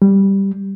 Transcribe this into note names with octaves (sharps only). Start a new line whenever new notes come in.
G3